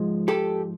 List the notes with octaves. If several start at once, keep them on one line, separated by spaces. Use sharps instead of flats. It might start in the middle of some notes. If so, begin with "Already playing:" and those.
Already playing: G#2 F3 G#3
G4 A4